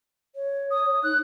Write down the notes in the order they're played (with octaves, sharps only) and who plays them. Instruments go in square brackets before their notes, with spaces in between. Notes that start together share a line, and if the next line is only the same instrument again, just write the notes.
[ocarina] C#5
[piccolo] D#6
[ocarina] D#4 [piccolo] F#6